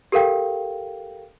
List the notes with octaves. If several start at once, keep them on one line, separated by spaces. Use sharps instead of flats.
G4 A4 A#4 F5 G5